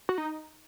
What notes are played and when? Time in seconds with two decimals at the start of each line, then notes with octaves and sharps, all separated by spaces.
0.09 F#4
0.18 D#4